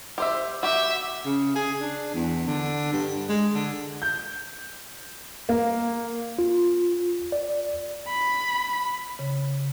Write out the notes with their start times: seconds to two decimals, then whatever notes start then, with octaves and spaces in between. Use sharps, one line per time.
0.18 G4 C5 E5
0.63 F#4 G4 E5
1.25 C#3
1.56 G#4
1.81 D4
2.15 E2
2.47 D3
2.93 G2
3.29 G#3
3.55 D3
4.02 G6
5.49 A#3
6.39 F4
7.32 D5
8.08 B5
9.19 C#3